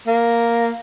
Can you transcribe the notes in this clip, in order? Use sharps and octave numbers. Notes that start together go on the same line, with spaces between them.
A#3